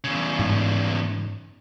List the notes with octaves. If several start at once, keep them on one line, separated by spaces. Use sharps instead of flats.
E2 C#3
G#2